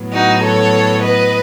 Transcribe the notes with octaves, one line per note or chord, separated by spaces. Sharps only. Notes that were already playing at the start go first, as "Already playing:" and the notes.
Already playing: A2 F#3 B3
D#4 F#4
A4 C#5
B4 D#5